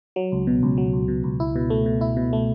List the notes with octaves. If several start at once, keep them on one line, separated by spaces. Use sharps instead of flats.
F#3
C#2
B2
C#2
F#3
C#2
B2
C#2
E4
B2
A3
B2
E4
B2
A3